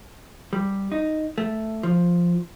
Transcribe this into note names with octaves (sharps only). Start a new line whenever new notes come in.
G3
D#4
A3
F3